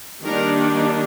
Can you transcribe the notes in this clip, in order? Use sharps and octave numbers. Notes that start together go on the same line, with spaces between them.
D#3 G3 A#3 D4 A#4